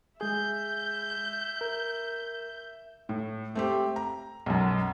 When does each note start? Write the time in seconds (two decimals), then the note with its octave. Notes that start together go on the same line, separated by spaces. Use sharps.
0.21 G#3 G#4 E5 G6
1.61 A#4
3.09 A2
3.55 A3 C4 G4
3.96 A#5
4.46 B1 F#2